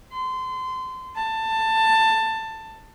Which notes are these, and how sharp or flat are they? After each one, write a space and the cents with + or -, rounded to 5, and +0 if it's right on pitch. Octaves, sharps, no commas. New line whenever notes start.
C6 -25
A5 +15